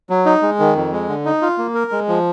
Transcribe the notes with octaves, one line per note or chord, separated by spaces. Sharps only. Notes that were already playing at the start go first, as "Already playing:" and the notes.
F#3
D#4
G#3
D#3
F2
G#3
D3
D#4
F4
A#3
A#4
G#3
F3